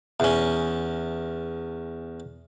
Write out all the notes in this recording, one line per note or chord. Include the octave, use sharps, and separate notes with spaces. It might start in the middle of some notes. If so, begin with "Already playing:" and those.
E2 C#4